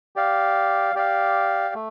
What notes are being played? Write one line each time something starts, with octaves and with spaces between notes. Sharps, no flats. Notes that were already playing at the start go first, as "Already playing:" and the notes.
G4 D5 F5
G4 D5 F5
A3